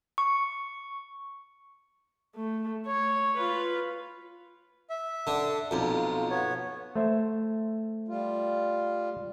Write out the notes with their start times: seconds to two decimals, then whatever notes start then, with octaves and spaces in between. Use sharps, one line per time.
0.18 C#6
2.35 A3
2.87 C#5
3.38 F4 B4
4.90 E5
5.27 D3
5.71 B1 F2 F4
6.30 B3 C#5
6.96 A3 C5 E5
8.08 G3 F4